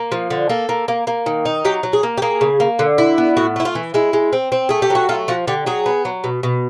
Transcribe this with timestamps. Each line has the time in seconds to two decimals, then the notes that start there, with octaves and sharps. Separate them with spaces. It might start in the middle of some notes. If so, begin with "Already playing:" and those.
Already playing: A#3
0.12 F3
0.30 D3
0.49 A#3 A4
0.69 A#3
0.88 A#3
1.07 A#3
1.26 D#3
1.45 D#4
1.65 F#3 G4
1.83 F#3
1.93 G#4
2.03 A#3
2.17 G4
2.22 A#3 G#4
2.41 C#3
2.60 A#3
2.79 D3
2.98 E4
3.18 B3
3.37 A2 F#4
3.56 A3 E4
3.65 F4
3.75 E3
3.94 G#3 E4
4.13 G#3
4.33 C4
4.52 C4
4.69 A3 G#4
4.82 G4
4.90 F#3 F#4
5.09 A3 F4
5.28 F3 F#4
5.47 D3 G4
5.66 F#3 G#4
5.86 B3
6.05 F#3
6.24 B2
6.43 B2